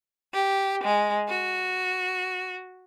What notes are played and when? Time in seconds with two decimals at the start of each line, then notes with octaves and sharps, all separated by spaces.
0.33 G4
0.83 G#3
1.27 F#4